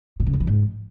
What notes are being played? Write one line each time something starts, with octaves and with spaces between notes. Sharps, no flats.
B2
C#3
F2
E3
G#2